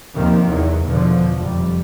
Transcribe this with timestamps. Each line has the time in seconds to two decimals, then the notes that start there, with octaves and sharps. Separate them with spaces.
0.15 D#2 C3 D#3 F3
0.47 E2 F#3
0.83 E2 B2 D3 F3
1.39 F1 C3 G3